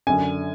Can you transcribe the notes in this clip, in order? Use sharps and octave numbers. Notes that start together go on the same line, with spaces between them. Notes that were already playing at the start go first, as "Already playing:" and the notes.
F#2 D3 G#5